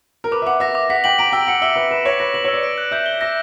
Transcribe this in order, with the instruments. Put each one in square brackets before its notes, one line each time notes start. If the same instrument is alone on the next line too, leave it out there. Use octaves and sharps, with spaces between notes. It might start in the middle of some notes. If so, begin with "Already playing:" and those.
[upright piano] A#4
[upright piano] B4 [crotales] D6
[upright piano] E5
[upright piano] F#5 [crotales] D6
[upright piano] E5 [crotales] A#6
[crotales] D6
[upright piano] F#5 [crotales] B6
[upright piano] G5 [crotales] F#7
[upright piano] A#5 [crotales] D7
[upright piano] G5 [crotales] E6
[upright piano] F#5 [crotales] C#7
[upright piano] E5 [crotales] E6
[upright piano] B4 [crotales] E6
[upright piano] B4 [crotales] E7
[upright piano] C#5 [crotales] A#6
[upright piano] B4 [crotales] A#6
[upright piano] B4 [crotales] F#7
[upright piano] C#5 [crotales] E6
[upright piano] D5
[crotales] D7
F#6
[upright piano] E5 [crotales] G6
[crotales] G7
[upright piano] E5 [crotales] A#6